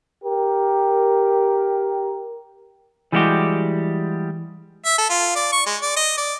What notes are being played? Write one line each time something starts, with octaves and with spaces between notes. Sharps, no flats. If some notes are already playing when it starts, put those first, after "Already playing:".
G4 A#4
E3 G3 G#3 E4 F#4 G4
E5
A4
F4
D5
C#6
G#3
D5
D#5
D5